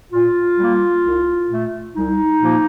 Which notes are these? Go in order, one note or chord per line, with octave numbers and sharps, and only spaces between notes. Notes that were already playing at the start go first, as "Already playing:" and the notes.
A#2 F4
G3 A#3
C2
A#2 A3
C2 D#4
A#2 F3 A#3